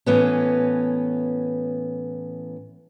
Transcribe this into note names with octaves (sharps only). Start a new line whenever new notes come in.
A2 E3 B3 C#4